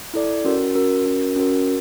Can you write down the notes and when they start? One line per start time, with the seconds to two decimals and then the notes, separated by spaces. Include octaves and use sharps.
0.14 E4 A4 D5
0.45 C#4 F#4 A#4
0.75 C#4 F#4 A#4
1.06 C#4 F#4 A#4
1.36 C#4 F#4 A#4